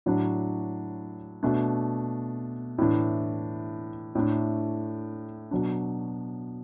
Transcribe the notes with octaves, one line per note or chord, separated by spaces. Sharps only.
A2 F#3 D4
B2 A3 D4
A2 E3 D4
A2 A3 D4
B2 F#3 D4